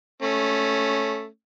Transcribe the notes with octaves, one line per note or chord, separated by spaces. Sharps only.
A3 C#4